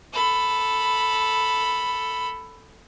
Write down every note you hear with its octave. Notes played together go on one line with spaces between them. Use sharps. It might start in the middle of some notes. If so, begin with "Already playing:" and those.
A4 B5